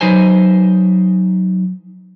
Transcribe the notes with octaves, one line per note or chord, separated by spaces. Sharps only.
F#3 D#4 B4 C5 G#5